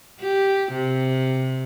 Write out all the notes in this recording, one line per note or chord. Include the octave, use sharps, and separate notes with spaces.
G4
C3